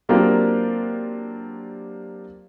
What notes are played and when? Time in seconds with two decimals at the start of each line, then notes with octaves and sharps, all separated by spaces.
0.09 F#3 A#3 C4 D4 F4 G4